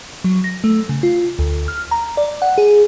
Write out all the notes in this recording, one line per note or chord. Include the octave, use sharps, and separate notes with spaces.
F#3
A#6
A3
C#3
F4
D2
F6
A#5
D5
F#5
G#4